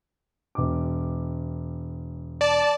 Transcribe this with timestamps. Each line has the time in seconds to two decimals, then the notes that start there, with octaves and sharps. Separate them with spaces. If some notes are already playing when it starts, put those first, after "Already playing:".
0.55 E1 D6
2.41 D5 A5